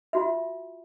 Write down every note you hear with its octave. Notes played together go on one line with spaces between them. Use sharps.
F4 F#4 E5